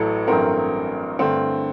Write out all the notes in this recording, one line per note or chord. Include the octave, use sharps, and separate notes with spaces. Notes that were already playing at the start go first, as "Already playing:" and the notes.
Already playing: A1 A2 F#3 A4
A1 G2 F#3 A3 C4 A#4
G2 D3 A3 C4